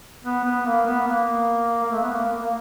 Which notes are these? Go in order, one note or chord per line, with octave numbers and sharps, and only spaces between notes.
B3
B3
A#3
B3
A#3
A#3
A3
B3
A#3
A#3
A#3